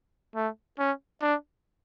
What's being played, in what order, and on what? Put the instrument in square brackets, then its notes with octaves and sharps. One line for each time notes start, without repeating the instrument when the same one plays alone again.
[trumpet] A3
C#4
D4